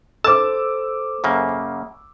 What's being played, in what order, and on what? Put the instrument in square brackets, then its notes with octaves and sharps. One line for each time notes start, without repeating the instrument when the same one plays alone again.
[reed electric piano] A4 C5 [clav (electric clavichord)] A5 [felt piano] D6 E6
[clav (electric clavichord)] F#2 C#3 A#3